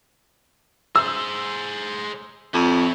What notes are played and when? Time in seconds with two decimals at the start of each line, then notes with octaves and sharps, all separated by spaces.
0.96 G#4 C5 E6
2.54 F2 E4 C#5